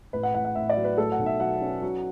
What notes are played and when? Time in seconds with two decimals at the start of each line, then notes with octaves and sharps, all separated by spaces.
0.13 A1 B4
0.23 F#5
0.34 A1 F#5
0.45 F#5
0.55 A1 E5
0.69 D5
0.77 F#3
0.84 B4
0.97 A2 A4
1.12 F#5
1.19 B1
1.26 E5
1.40 F#3 F#5
1.61 C#4
1.82 F#3